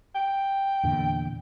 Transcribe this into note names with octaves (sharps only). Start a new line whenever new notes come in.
G5
E2 A#2 D3